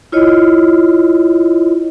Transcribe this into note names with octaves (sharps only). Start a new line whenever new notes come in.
E4 F4 C#5 D#5